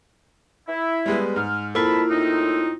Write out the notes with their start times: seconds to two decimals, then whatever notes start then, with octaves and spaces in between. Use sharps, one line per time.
0.68 E4
1.06 G3 G#3 B3
1.36 G#2 F6
1.75 F2 A#3 E4 F4 A5 B5
2.10 A2 C4 D#4